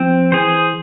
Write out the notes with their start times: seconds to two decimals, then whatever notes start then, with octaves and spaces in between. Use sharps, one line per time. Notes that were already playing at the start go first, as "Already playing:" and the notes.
Already playing: F3 C4
0.32 E3 G#4 C5